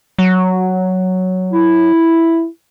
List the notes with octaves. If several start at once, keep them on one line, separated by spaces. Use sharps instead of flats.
F#3
E4